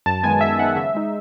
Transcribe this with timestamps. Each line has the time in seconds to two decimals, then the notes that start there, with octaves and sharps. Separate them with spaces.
0.06 F#2 A5
0.23 D#3 G#3 B3 G#5
0.41 F#2 E5
0.59 D#3 G#3 B3 F#5
0.76 C#3 E5
0.94 G#3 D#4